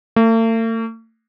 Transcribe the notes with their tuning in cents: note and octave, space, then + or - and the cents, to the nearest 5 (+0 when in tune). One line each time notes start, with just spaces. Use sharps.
A3 +45